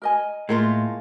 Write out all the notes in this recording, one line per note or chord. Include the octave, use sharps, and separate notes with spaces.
A#4 D#5 G#5
A2 G#3 A#3 F4